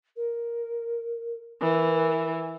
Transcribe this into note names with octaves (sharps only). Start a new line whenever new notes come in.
A#4
E3 A#4